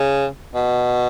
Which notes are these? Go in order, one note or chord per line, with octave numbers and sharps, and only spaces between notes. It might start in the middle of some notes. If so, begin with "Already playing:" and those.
Already playing: C#3
B2